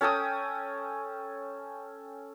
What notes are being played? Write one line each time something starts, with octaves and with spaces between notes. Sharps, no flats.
C#4 A4 G5 D#6